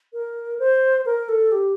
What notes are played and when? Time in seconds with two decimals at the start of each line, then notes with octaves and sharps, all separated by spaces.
0.13 A#4
0.59 C5
1.06 A#4
1.29 A4
1.52 G4